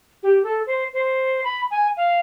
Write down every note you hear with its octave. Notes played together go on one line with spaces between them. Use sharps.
G4
A4
C5
C5
B5
G#5
F5